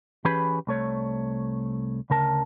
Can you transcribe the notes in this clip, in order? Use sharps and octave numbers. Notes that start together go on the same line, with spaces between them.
E3 C#4 G4 G#4 B4 B5
C2 A3 C#5
D2 C#3 A#4 A5